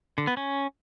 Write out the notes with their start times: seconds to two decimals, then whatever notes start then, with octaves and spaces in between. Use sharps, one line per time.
0.18 D3
0.27 B3
0.37 C#4